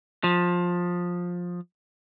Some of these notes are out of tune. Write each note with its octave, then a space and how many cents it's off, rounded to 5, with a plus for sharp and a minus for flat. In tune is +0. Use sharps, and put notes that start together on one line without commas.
F3 +15